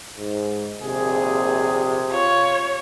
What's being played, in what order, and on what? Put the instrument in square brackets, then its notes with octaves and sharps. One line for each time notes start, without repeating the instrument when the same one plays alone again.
[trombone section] G#2
[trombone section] A#1 D#2 G#4 [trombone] C3
[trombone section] F4 [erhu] C#5